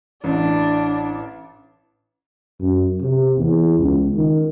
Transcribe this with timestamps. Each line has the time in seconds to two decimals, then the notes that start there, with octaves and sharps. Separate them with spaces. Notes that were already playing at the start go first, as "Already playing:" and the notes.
0.24 A1 D4
2.60 F#2
3.01 C3
3.37 E2
3.79 C#2
4.15 D#3